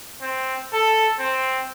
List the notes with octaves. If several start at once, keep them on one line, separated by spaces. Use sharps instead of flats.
C4
A4
C4